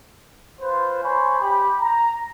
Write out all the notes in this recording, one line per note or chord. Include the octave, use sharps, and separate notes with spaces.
F4 B4 C5
C5 C#5 G#5 B5
G4 B5
A#5